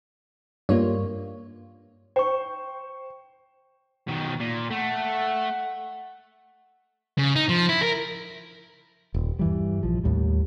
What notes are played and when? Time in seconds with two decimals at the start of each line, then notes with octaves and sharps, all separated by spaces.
0.69 G2 A#3 F4 C#5
2.16 C5 G5 C#6
4.08 B2 D#3
4.40 A#2
4.71 A3 F#5
7.18 C#3
7.36 D#4
7.49 F3
7.69 E4
7.82 A#4
9.14 D#1
9.39 G2 E3 G3
9.83 A#1 F3
10.04 D#2 A2 G3